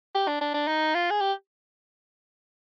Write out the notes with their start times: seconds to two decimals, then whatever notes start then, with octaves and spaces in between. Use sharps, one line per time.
0.15 G4
0.28 D4
0.41 D4
0.54 D4
0.68 D#4
0.94 F4
1.11 G#4
1.21 G4